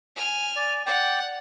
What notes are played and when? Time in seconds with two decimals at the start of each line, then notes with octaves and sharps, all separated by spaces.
0.16 G#5 F6
0.56 D5
0.86 D5 F#5 G5